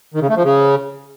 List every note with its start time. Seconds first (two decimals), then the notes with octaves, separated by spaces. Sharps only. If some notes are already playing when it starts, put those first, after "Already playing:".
0.14 D#3
0.22 C#3
0.29 A3
0.36 F3
0.44 C#3